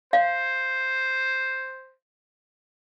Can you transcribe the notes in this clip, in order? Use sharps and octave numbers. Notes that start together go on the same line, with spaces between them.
C5 F5